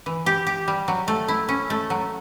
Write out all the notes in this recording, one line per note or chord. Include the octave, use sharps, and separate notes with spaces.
E3
G4
G4
G3
F#3
A3
E4
C#4
A3
F#3